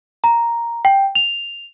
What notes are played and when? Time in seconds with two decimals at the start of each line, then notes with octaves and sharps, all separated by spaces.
0.24 A#5
0.85 G5
1.15 F7